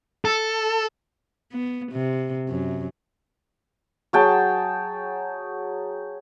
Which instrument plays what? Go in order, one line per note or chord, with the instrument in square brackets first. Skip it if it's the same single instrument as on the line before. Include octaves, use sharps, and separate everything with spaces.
[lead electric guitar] A4
[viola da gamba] B3
C3
F#2
[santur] F#3 G#4 G5 A5